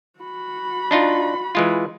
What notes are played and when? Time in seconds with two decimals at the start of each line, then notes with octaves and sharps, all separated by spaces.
0.20 F#4 B5
0.91 D4 D#4 F4
1.55 E3 G#3 F4